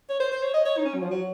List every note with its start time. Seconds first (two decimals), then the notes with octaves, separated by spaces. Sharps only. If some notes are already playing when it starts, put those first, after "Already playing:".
0.09 C#5
0.20 C5
0.32 C5
0.43 C#5
0.54 D#5
0.65 C#5
0.78 D#4
0.85 C#4
0.95 F#3
1.02 F3
1.11 F#3